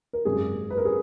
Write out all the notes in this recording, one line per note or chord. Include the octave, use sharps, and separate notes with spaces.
A#4
G#1 F#2 C#3 G#4
B4
A#4
G#4